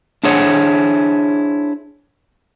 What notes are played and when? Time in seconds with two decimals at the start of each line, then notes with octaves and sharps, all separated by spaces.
0.24 D4 E4 G#4 C5 C#5 F#5